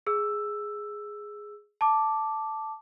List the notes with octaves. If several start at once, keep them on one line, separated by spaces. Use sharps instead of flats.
G#4 E6
A5 D6